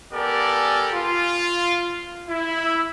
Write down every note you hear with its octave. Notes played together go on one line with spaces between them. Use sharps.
B3 G4 A4 A#4 D5 G#5
F4
E4